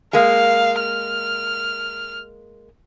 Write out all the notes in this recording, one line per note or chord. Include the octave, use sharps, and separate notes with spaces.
G#3 A#3 F5
F6